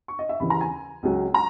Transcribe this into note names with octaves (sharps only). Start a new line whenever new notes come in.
C#6
D#5
E5
D#2 C#3 E3 B5
A#5
G#5
C#2 C#3 F#3
A#5